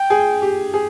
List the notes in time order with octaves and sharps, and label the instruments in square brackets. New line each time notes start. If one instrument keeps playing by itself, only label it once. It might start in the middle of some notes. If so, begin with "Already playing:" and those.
Already playing: [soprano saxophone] G5
[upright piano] G#4
G4
G#4